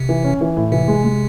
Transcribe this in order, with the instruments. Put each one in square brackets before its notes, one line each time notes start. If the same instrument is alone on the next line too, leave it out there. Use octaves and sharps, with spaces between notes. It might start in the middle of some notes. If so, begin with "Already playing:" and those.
Already playing: [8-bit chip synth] C3
[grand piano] E3
C#4
E3
A2
[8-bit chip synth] C3 [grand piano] E3
[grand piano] G#3
G#3